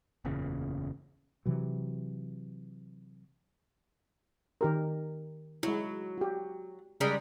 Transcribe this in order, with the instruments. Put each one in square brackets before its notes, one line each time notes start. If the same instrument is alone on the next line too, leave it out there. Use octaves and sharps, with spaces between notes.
[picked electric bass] F#1 E2 A#2 C#3
[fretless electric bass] C3 E3 F#3
[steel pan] D#3 G4 A#4
[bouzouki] F#3 [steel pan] G#3 E4
[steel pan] F#4 G4
[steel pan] C#3 [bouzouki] G3 G#3 A#4